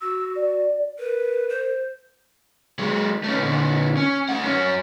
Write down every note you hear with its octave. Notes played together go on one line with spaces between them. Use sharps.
F#4 E6
D5
A#4 B4
C5
F#3 G#3
A3 C#4
A#2 D3
C#4
A3 F#5
F#2 C#4